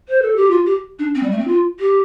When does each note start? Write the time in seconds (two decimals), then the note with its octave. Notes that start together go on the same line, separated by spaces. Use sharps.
0.08 C5
0.22 A4
0.36 G4
0.50 F4
0.66 G4
0.99 D4
1.15 C4
1.23 G3
1.31 A3
1.39 C4
1.47 F4
1.79 G4